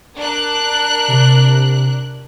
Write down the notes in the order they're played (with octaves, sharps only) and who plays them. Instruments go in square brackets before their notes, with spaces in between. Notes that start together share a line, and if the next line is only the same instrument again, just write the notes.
[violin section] D4 A#4 F#6
[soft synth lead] C3